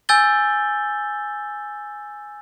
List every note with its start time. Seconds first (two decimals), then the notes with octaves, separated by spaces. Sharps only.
0.09 G#5 E6 G6 A6 G7